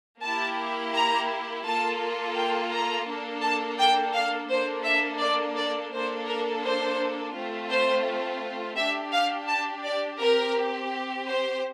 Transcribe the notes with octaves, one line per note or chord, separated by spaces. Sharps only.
A#3 E4 G4 A5
A#5
A#3 F4 A4 A5
G5
A#5
A#3 D4 A4
A5
G5
F5
A#3 D4 A4 C5
E5
D5
D5
A#3 D4 A4 C5
A#4
C5
A3 C4 F4
C5
D4 G4 E5
F5
A5
D5
C4 G4 A#4
C5